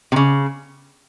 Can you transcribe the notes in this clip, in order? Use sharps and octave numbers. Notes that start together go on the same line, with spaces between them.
C3
C#3